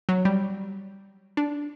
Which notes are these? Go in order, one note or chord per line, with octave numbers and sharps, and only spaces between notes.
F#3
G3
D4